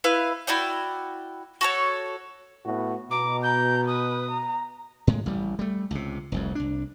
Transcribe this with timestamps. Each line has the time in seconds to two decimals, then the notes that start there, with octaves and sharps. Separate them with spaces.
0.04 E4 B4 F5
0.47 E4 F#4 D5 G5
1.61 F#4 A4 C#5
2.65 A2 B3 F#4
3.11 B2 A#5 D6
3.43 A#5 G6
3.87 B4 D#6
4.30 A#5
5.07 A2 G#3
5.26 A1 G3
5.59 G3 A3
5.91 C#2 C3
6.32 F1 C2 F2
6.55 C2 D4